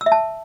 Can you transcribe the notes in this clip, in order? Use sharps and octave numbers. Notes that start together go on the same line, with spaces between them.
E6
E5
A5